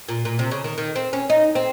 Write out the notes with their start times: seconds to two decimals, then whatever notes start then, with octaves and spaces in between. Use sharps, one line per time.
0.08 A#2
0.25 A#2
0.39 C3
0.51 C#3
0.64 D#3
0.78 D#3
0.96 C4
1.13 C#4
1.30 D#4
1.55 C4